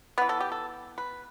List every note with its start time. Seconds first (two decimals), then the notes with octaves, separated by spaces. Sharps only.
0.18 E3 B3 B4
0.29 A4
0.40 G4
0.52 A4
0.98 B4